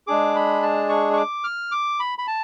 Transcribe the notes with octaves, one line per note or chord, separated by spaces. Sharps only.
G#3 D4 G#4 D6
B5
A5
C#6
C#6
D6
F6
D6
B5
B5
A5